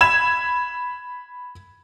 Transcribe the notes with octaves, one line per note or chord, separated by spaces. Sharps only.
B5 G#6 E7